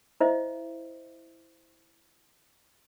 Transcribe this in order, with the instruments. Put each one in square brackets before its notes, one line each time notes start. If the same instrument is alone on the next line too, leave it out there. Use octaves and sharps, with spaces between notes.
[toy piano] E4 C5 D#5 E5